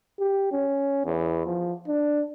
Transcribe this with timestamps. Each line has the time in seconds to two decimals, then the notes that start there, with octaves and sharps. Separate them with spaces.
0.19 G4
0.52 C#4
1.05 E2
1.46 F3
1.88 D4